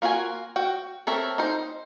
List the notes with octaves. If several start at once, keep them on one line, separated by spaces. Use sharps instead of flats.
A#3 F4 F#4 G#5
F#4 G5
C4 A4 A#4 C#5 E5
D#4 C5